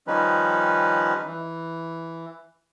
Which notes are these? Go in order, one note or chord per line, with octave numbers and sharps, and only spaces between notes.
D#3 F3 G3 C#4 D#4 B4
E3